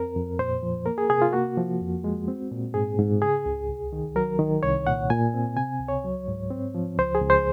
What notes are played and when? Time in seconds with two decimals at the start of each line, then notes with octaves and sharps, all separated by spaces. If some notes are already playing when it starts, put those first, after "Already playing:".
Already playing: F2 C4 A#4
0.16 F2
0.39 A#2 C5
0.63 F3
0.86 A#3 A#4
0.98 G#4
1.10 C3 G#4
1.22 F4
1.33 A#3 F#4
1.57 F3
1.81 F2
2.04 G#3
2.28 C4
2.51 A#2
2.74 G#2 G#4
2.98 G#2
3.22 C#3 G#4
3.46 C#2
3.69 C2
3.93 D#3
4.16 F#3 A#4
4.39 D#3
4.63 C2 C#5
4.87 A#2 F#5
5.10 A#2 G#5
5.34 C4
5.57 C3 G#5
5.80 C#2
5.89 C#5
6.05 F#3
6.28 G#2
6.51 C4
6.75 F3
6.99 C#2 C5
7.15 G#4
7.22 C#2
7.30 C5